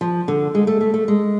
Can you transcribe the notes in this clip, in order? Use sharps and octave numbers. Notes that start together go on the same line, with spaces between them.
F3
D3
G#3
A3
A3
A3
G#3